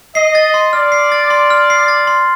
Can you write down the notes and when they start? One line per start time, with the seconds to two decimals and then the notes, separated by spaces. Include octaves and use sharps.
0.15 D#5 C7
0.35 A6
0.54 C6
0.73 D5 F6
0.92 C7
1.12 A6
1.30 C6
1.50 F6
1.70 C7
1.88 A6
2.07 C6